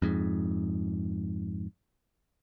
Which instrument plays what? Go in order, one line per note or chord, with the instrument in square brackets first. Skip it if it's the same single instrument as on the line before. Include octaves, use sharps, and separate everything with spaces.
[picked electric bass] F2 G#2